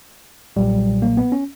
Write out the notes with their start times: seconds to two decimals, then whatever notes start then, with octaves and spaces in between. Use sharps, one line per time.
0.56 B1 A#2 F#3 G3
1.02 A#3
1.17 B3
1.32 C#4